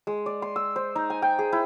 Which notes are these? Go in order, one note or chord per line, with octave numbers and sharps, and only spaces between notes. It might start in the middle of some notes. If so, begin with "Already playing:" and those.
G#3
D5
C6
E6
C5
D#4
G#5
G5
G#4
E4